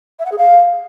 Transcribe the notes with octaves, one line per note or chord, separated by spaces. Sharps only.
E5
F#5
G#4
F5